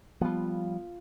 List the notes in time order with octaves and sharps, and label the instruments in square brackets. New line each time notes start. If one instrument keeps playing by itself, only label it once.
[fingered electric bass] F3 G3 [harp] B3 F4